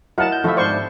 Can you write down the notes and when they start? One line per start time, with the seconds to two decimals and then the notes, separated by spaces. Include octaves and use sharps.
0.18 F#3 E4 F4 A#4 D#5 F#5 A5
0.32 G6
0.44 F3 A3 D#4 E4 G4 E5
0.57 G#2 B3 D4 C5 D5 B5 C#6